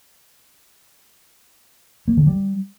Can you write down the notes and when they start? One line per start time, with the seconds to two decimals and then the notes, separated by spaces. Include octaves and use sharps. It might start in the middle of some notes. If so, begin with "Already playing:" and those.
2.08 A#3
2.17 D3
2.27 G3